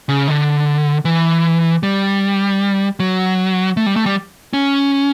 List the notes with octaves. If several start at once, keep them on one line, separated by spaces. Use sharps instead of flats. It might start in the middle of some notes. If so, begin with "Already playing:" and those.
C#3
D3
E3
G3
F#3
A3
G3
A3
G3
C#4